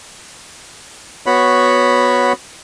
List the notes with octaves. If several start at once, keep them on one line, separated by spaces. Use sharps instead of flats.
B3 F#4 C#5 B5